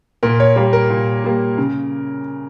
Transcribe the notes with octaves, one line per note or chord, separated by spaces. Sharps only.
A#2 A#4
C#5
G3 A#3 C#5
A#4
A#2
G3 A#3
C#3